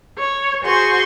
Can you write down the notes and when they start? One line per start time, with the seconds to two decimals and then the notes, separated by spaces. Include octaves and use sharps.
0.19 C#5
0.63 F#4 G#4 C5 C6 C#6